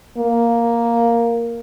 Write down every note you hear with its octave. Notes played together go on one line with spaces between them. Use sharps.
A#3